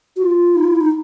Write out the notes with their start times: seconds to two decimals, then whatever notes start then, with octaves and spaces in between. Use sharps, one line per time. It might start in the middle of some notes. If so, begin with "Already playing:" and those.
0.16 F#4
0.23 F4
0.56 D#4
0.64 F4
0.72 E4
0.81 D#4